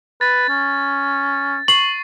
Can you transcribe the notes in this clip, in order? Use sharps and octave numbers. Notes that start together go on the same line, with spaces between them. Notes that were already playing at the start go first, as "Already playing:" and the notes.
B4 A6
C#4
C#6 C7 F#7